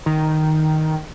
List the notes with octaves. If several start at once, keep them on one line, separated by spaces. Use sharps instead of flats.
D#3